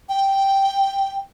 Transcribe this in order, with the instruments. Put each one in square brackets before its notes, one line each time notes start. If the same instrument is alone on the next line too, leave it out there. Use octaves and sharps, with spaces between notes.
[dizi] G5